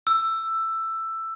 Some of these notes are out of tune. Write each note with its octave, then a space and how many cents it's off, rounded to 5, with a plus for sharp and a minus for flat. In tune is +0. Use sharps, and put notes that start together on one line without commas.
E6 +10